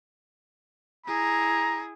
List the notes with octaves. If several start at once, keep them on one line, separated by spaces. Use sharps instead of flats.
E4 G#4 A#5